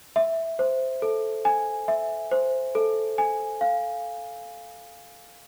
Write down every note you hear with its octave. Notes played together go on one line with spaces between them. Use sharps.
E5
C5
A4
G#5
E5
C5
A4
G#5
F5